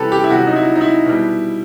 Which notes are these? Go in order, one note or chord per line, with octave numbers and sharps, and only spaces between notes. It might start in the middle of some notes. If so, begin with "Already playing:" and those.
Already playing: C3 E3 G3 G4 A4 B4
G4
E4
C3 F#3 F#4
D#4
E4
D#4
E4
B2 G3